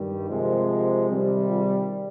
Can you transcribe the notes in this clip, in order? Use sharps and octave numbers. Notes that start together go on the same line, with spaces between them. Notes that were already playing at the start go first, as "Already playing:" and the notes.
Already playing: G2 D#3 G3
C3 F3 G#3 G4 A#4
C3 D#3 G3
F4 G#4